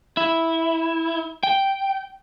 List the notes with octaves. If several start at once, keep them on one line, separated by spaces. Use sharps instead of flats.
E4
G5